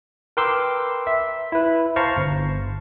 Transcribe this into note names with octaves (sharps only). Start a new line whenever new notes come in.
A#4 B4 G5 C6 D6 E6
E5
E4 B4
C5 F5 A5 A#5 C#6
G1